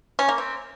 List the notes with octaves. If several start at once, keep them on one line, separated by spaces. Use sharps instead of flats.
C#4
A#3
C4